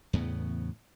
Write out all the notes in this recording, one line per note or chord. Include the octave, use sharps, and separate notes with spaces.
E2 A2 C#3 B3